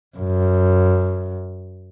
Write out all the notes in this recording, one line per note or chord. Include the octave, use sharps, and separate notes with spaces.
F#2